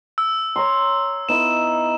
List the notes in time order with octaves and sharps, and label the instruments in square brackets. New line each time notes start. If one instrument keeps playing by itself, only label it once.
[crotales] E6
[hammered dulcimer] C#5 A#5 C6
[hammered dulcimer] B3 D#4 E4 [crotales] E7